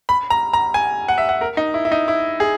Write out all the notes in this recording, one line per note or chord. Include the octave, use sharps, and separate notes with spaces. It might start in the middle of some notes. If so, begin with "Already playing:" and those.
B5
A#5
A#5
G#5
F#5
E5
F#5
A#4
D#4
E4
E4
D#4
E4
G#4